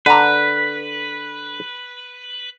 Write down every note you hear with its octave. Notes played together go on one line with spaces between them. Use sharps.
D3 B4 A#5